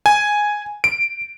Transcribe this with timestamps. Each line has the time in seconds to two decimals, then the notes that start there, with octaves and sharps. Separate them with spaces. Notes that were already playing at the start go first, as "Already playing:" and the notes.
0.06 G#5
0.84 D7